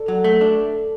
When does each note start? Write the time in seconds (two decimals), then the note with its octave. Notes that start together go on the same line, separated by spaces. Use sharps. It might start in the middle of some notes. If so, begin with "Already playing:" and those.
Already playing: A4 D5
0.08 F#3
0.24 A3
0.41 D4